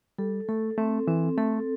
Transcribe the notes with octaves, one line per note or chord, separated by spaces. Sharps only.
G3 A4
A3 A4
A3 C4
E3 C4
A3 A4